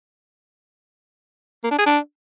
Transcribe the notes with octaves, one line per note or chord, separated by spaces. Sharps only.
A#3
D4
G#4
D4